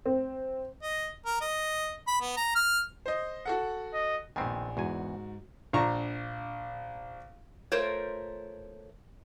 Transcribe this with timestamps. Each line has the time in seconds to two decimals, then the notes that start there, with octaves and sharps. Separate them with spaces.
0.06 C4
0.82 D#5
1.26 A#4
1.41 D#5
2.07 B5
2.21 B3
2.37 A#5
2.55 F6
3.06 C5 D#5
3.45 F#4 A4 F#5
3.94 D#5
4.36 A#1 D#3 B3 C4 G#5
4.77 E2 G#2 F#4 G#5
5.73 A#1 D4 A#5 C#6
7.72 A3 F4 A#4 C5 C#5